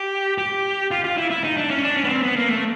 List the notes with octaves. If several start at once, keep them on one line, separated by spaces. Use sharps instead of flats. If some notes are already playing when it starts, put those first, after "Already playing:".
Already playing: G4
G4
F4
F4
E4
E4
D#4
D4
C#4
D4
C#4
B3
C4
B3
A#3
A3